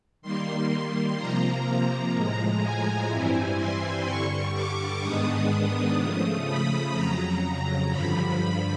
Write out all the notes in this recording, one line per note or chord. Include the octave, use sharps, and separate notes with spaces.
D#3 G3 A#3 C6
C3 F3 A#3 A#5
A#5
A2 F3 G#3
G#5
G2 E3 G3 C4 E4
C6
G2 D3 G3 C#6
D6
G#2 D#3 G#3 B3 D4 D#6
C#3 F3 A3
B5
F2 C#3 F#3 A#5
A#5
G2 D3 F3 B5
B5